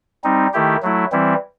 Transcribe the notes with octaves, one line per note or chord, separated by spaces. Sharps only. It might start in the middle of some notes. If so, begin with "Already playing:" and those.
G3 C4 D#4
D#3 A3 E4 G4
F#3 A3 E4
E3 G3 C4 E4